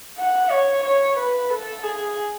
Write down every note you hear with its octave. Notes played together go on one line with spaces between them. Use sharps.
F#5
C#5
C#5
B4
A4
G#4